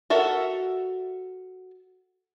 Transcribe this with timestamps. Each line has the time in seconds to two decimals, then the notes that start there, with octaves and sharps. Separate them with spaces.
0.10 F#4 A4 A#4 E5